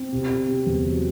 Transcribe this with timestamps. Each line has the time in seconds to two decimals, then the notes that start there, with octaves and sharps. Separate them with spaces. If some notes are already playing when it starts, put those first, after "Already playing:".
Already playing: C4
0.12 C3
0.30 C3
0.48 C3
0.66 E2
0.84 F#3